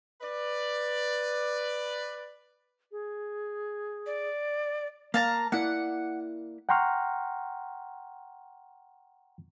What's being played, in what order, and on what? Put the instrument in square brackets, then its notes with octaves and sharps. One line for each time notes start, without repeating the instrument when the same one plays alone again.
[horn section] B4 D5
[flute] G#4
[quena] D5
[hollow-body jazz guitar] A#3 [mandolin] F5 A5 A#5
[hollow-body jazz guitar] A#3 E4 D5 [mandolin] F#5
[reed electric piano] F#5 G5 A#5 C6 C#6 F6